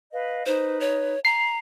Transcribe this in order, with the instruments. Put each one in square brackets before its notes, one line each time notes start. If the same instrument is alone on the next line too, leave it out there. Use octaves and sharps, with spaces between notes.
[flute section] B4 D#5 F5
[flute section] D#4 B4 [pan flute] C5
[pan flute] C#5
[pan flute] A#5 [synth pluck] C7